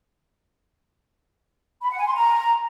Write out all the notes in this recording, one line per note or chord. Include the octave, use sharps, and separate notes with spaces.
B5
F#5
G#5
C6
A#5